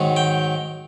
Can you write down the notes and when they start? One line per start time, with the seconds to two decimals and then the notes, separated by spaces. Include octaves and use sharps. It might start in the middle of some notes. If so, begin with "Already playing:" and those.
Already playing: G#2 D#3 F#3
0.16 G5